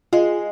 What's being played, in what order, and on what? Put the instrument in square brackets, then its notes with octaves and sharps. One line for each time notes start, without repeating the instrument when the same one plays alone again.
[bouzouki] G#3 [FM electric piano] F4